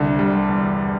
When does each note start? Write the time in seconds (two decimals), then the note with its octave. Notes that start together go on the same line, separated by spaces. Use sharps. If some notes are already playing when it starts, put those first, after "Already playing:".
Already playing: C2 D3
0.19 G3
0.49 E2